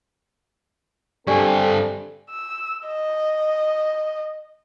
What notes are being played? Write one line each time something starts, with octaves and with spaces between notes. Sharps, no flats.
G2 D3 C4 G4 A4 D5 G#5
E6
D#5